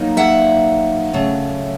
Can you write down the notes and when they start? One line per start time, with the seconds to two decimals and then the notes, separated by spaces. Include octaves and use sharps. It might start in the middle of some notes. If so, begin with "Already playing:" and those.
Already playing: F#3 A#3 D#4
0.17 E5 F#5
1.13 C#3 F#3 A3